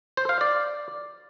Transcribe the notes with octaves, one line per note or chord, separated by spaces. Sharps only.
C5
F5
D5